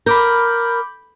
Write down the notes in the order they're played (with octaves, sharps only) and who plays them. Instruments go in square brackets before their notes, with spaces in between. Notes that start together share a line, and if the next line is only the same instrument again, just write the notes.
[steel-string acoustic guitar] A#4 [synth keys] B5 D6 G6